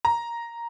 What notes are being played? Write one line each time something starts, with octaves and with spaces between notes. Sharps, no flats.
A#5